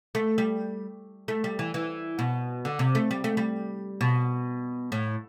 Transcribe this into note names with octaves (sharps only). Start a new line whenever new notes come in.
A3
G3
A3
G3
E3
E3
B2
D3
C3
A3
G3
A3
G3
B2
A2